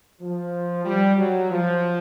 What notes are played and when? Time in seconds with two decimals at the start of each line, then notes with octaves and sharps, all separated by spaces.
0.20 F3
0.85 G3
1.17 F#3
1.50 F3